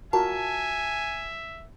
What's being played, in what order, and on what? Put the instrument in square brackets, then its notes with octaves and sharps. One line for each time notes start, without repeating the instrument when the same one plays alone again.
[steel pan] F4 F#4 A#4 [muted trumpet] E5 [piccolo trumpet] G#5 [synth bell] A5